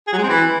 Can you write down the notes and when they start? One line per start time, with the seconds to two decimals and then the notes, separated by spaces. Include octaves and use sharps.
0.07 G#4
0.13 F#3
0.18 G#3
0.23 C4
0.29 E3